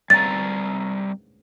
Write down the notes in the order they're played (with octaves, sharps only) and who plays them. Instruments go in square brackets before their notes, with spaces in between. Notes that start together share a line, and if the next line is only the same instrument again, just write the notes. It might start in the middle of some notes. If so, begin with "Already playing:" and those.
[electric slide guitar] G3 C4 A#5 [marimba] A6